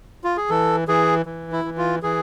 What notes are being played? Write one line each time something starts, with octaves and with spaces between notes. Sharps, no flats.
F4
G#4
E3 A4
E3 G#4
E3
E4
E3
F4
E3 G#4